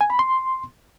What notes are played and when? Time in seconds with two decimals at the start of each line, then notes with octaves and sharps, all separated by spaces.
0.01 G#5
0.10 B5
0.19 C6